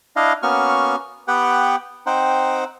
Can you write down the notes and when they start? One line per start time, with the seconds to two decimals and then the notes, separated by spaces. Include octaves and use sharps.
0.16 D4 E4 D#5 F5
0.43 A#3 B3 C#4 F#4 C#6 F6
1.28 B3 G4 B4 F#5 G5
2.06 C4 D#4 C5 F#5 G5